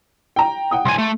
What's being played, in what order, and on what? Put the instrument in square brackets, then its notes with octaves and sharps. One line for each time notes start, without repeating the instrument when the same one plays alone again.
[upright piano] G5 A#5
F#5 G5 D#6
[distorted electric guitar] C2 G#5 [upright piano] C6
[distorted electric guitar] A3